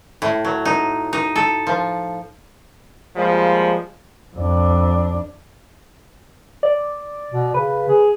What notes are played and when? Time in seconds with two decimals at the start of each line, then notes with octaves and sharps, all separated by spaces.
0.22 A2
0.45 F#3
0.65 D#4
1.13 D#4
1.36 A4
1.67 F3
3.16 F3 G3 G#3 A#3
4.36 F2 D4
6.63 D5
7.32 B2
7.54 C#3 B4
7.88 G#4